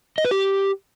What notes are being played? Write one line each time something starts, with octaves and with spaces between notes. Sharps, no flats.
D#5
B4
G4